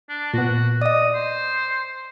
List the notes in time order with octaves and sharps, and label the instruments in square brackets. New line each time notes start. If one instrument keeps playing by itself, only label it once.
[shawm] D4
[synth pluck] A#2 B3 [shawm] F#4
[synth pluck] D5 D#5 [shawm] D#6
[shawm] C5